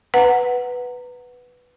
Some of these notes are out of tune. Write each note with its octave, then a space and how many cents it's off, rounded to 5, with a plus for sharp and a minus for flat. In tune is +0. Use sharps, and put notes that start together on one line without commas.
B4 +0 F#5 +0 A#5 -20